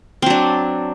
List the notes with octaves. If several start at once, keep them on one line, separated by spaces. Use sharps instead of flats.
F#3 C4 D4